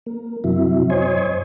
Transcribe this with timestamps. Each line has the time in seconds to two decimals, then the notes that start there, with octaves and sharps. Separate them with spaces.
0.06 A#3
0.44 F#2 C3 F#3 E4
0.90 F#2 C5 C#5 D#5 G#5